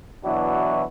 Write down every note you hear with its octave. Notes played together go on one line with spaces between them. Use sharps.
B2 E3 F#3 D4 E4 F#4